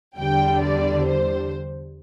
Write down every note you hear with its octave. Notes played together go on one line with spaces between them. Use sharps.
E2 D3 G3 G5
D5
C5